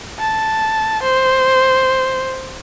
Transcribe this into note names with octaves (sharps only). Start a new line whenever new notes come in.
A5
C5